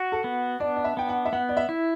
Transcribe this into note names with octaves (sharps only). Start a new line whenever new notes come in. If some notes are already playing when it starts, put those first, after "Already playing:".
Already playing: F#4
A4
B3
D4 D5
D5
E5
B3 G5
F#5
E5
B3 F#5
D5
E5
E4